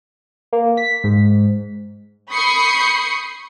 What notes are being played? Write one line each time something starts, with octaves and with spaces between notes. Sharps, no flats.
A#3
B6
G#2
B5 C#6 D#6 G6 C7 C#7